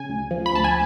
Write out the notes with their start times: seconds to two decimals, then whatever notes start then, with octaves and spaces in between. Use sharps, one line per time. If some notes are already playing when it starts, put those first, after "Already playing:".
Already playing: C#3 G#5
0.09 D2
0.31 F3
0.46 B5
0.53 D2 A5
0.64 G#5